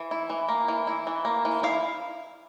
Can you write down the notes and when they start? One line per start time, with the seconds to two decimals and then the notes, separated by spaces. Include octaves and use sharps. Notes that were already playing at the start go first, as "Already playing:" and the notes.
Already playing: E3
0.11 E4
0.30 E3
0.48 A#3
0.68 E3
0.87 E4
1.07 E3
1.25 A#3
1.45 E3
1.63 E4 F5